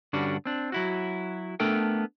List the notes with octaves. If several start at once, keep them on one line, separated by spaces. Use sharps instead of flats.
G2 D3 G3 C#4 D4 F#4
C4 D4
F#3 E4 F#4
A3 B3 D4 A4 A#4 G5